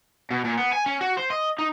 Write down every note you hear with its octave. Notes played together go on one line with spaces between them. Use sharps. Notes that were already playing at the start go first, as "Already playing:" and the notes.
B2
A#2
B3
G#5
C#4
F#4
C5
D#5
D#4